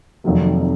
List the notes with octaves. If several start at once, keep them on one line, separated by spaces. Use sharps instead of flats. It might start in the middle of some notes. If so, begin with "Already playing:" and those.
F1 F2 D#3 F#3 A#3